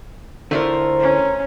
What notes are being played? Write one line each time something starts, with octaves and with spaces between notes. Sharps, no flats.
D3 A3 D4 E4 F4 A#4 C5
C#4